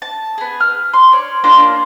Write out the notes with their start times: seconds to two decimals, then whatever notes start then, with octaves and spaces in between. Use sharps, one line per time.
0.02 A5
0.38 B3 G#4
0.60 F6
0.94 C6
1.12 C#5 D5
1.44 A#3 D4 F4 C6